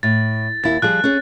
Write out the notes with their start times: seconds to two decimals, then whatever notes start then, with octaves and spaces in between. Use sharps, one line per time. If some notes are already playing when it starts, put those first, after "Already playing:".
0.03 A2 A6
0.64 D#2 E4 A6
0.82 F3 G3 G#4 F#6
1.04 C#4 G#4